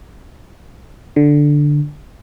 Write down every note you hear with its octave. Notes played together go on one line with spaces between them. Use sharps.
D3